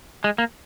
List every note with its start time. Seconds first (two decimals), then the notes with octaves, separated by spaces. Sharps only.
0.24 G#3
0.38 A#3